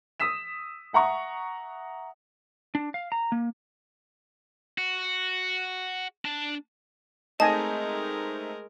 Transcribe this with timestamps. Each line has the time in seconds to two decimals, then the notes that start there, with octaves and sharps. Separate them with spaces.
0.20 D#6 E6 B6 E7
0.93 E5 F#5 A#5 C#6 D#6
2.75 D4
2.94 F5
3.12 A#5
3.32 A#3
4.78 F#4
6.25 D4 A5
7.40 G#3 A3 C4 D#4 A#4 D#5 G#5 A5